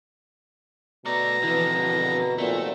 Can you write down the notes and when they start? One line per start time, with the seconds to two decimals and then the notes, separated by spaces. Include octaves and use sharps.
1.06 B2 A3 D5 A#5
1.43 F2 D3 E3
1.74 E1
2.38 F1 A#2 A3